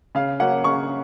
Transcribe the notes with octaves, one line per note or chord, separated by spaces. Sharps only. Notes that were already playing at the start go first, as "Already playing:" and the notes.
C#3 F5
F#3 A#3 C#4 F#5
C#3 C#6